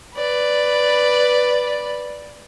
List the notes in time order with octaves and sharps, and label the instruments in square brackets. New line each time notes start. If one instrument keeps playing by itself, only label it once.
[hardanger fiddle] B4 D5